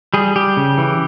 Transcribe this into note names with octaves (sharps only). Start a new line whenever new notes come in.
G3 G#4
G3 G4
C#3
E3